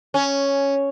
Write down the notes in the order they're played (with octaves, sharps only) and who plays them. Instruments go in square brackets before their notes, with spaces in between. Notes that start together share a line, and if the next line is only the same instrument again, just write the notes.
[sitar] C#4